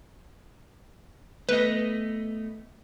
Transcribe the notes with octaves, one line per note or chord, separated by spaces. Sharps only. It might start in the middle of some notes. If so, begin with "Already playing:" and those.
A3 B3 B4 D#5